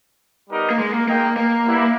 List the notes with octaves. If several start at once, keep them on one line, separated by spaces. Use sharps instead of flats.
G3 B3 D#4 G4 A#4
A#3
G#3
A#3
G#3 A#3 D#4 A#4 D#5 G5
A#3
G3 B3 E4